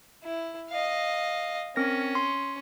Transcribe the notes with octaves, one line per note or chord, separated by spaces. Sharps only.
E4
D#5 F5
C4 C#4 A#4 A#6
C6